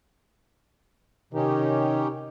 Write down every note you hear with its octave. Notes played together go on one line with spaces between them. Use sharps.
C3 D#3 C#4 D#4 G4